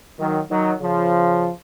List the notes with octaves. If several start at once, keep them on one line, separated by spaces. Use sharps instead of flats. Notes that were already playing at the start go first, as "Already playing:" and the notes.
D#3 F#3
D#3 F#3
C#3 F3